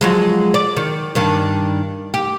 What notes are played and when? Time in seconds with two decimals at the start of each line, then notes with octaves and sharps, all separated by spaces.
0.01 F3 F#3 G#3
0.54 D5
0.77 D#3
1.15 G2 D#3 D4
2.14 G4